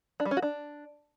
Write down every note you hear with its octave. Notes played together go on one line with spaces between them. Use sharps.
D4
G3
C#4
F#4
D4